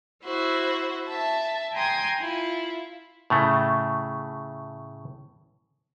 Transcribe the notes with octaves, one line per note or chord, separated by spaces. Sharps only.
E4 F#4 C5
E5 A5
G5 G#5 A#5 C6 D#6 G#6
E4 F4
A2 C#3 A3